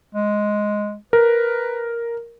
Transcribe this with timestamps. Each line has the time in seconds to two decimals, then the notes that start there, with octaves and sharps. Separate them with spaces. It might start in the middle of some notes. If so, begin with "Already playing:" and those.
0.15 G#3
1.13 A#4 B4